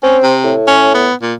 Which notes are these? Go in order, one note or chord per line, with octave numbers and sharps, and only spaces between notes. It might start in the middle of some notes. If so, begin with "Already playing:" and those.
C4 C#4
C3
A2
C#4
B3
A#2